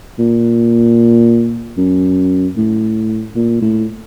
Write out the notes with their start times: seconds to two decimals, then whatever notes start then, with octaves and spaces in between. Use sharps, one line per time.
0.19 A#2
1.78 F#2
2.57 A2
3.36 A#2
3.62 A2